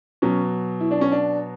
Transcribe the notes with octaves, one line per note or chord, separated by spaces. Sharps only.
B2 F#3 C#4
E4
D4
C#4
D4